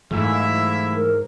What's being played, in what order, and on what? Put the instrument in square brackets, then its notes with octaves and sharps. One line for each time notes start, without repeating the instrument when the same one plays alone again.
[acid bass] G#2 [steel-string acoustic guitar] E3 F#3 A3 [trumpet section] A#3 E4 E5
[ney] A#4